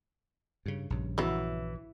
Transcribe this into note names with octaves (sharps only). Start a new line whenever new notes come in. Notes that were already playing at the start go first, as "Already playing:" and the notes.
G2 C#3
A#1 G2 C#3
E3 F#3 B3